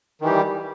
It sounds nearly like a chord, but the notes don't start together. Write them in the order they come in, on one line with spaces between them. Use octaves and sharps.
D#3 E3 G4 G3